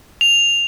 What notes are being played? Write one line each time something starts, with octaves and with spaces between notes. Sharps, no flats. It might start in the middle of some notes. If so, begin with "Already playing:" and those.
F7